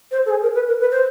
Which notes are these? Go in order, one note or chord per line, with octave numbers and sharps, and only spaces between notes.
C5
A4
G#4
A#4
B4
A#4
B4
C5